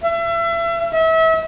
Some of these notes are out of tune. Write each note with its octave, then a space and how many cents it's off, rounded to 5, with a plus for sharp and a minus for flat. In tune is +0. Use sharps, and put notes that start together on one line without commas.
E5 +35
E5 -30